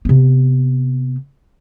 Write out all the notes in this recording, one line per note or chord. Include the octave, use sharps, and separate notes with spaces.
C3 B3